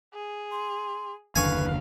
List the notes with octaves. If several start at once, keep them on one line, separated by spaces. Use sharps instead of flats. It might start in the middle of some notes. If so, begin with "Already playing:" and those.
G#4
C6
F#1 D#2 D3 B4 F5 G#5 C#6